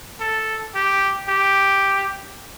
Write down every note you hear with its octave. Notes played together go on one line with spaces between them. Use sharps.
A4
G4
G4